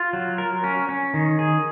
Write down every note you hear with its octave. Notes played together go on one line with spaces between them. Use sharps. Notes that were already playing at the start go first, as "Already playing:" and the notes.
Already playing: F4
F#3
A#4
C#4
C#4
D#3
G#4